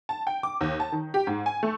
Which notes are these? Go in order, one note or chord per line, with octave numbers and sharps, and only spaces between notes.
A5
G5
D6
D#2
A5
D#3
G4
G#2
G#5
A3